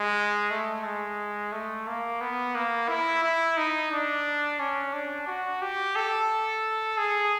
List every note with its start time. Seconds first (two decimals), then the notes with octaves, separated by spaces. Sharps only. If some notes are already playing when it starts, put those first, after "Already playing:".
Already playing: G#3
0.50 A3
0.84 G#3
1.53 A3
1.87 A#3
2.21 B3
2.55 A#3
2.88 E4
3.24 E4
3.57 D#4
3.91 D4
4.60 C#4
4.94 D4
5.27 F#4
5.62 G4
5.96 A4
6.98 G#4